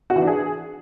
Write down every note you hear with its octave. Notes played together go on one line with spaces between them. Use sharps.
F#4
E3
D4
G#4